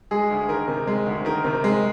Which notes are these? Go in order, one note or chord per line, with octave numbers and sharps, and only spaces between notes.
G#3 G#4
D2
D#3 A#4
C3
G#3
D2
D#3 A#4
C3
G#3